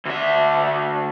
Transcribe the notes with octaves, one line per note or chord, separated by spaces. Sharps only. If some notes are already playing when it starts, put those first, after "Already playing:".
D2 E5